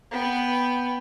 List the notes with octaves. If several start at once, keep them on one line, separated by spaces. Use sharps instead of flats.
B3 G5